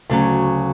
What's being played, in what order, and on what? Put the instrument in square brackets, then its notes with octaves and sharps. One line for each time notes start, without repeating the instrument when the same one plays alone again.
[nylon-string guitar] D2 C#3 F#3